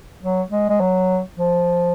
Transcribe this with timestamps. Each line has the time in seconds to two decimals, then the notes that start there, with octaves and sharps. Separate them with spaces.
0.22 F#3
0.50 G#3
0.70 G#3
0.80 F#3
1.38 F3